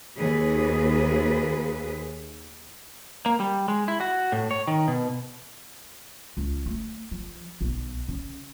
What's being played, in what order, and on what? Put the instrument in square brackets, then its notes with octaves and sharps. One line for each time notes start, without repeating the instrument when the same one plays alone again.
[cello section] D#2 G#4 B4
[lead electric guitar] A#3
G3
G#3
E4
F#4
A2
C#5
D#3
B2
[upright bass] C#2
A3
F3
B1
C#3